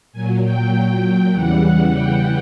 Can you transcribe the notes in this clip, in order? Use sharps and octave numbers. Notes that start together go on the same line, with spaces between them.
A#2 F#3 G#5
G5
E2 C#3 E3 G3 F#5
G5